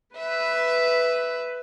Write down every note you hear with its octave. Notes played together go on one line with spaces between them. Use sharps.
B4 E5